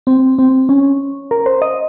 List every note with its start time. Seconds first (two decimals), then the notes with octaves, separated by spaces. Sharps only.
0.07 C4
0.39 C4
0.69 C#4
1.31 A#4
1.46 C5
1.62 D#5